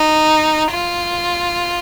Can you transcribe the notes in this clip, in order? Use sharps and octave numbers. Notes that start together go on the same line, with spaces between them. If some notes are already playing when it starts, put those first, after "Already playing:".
Already playing: D#4
F4